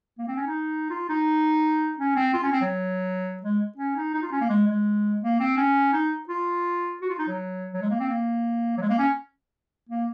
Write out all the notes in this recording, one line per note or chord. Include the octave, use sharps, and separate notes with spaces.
A#3
C4
C#4
D#4
F4
D#4
C#4
C4
F4
C#4
C4
F#3
G#3
C#4
D#4
D#4
F4
C#4
A#3
G#3
G#3
A#3
C4
C#4
D#4
F4
F#4
F4
D#4
F#3
F#3
G#3
A#3
C4
A#3
F#3
G#3
A#3
C#4
A#3